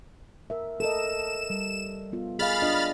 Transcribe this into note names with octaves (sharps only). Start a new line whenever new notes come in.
A#4 E5
A4 A#4 D#5 E7
G3
B3 F4
G#4 D#5 F5 B5 F6 A6
D4 F4 D#5